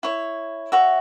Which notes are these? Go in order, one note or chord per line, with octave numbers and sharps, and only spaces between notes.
E4 C#5
F#4 C#5 E5